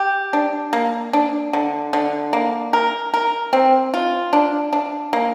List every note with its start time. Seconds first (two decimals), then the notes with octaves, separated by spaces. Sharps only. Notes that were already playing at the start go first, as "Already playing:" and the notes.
Already playing: G4
0.33 D4
0.73 A#3
1.13 D4
1.53 D3
1.93 D3
2.33 A#3
2.73 A#4
3.14 A#4
3.53 C4
3.94 F4
4.33 D4
4.73 D4
5.13 A#3